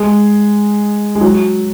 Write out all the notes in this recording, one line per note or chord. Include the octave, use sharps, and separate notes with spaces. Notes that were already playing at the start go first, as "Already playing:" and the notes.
Already playing: G#3
G#3
F#3